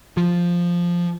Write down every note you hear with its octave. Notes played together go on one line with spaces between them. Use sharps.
F3